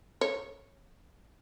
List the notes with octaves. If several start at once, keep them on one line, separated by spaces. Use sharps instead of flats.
C#5